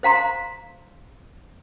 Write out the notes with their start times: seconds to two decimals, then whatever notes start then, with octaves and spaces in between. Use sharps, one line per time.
0.03 C5 F5 A#5 C6